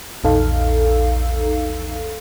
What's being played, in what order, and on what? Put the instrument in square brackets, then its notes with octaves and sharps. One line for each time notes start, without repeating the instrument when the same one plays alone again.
[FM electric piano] A#1 E2 D#4 A4 F5